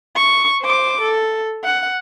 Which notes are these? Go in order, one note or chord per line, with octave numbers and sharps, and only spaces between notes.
C#6
C5 D6
A4
F#5